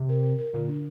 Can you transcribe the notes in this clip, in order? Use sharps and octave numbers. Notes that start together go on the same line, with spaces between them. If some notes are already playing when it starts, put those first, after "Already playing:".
Already playing: C3
A#4
A#4
A#4
A#2 D3
D4